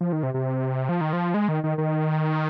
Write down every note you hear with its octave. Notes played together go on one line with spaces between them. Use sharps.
F3
D#3
C3
C3
F3
D#3
F3
G#3
D#3
D#3
D#3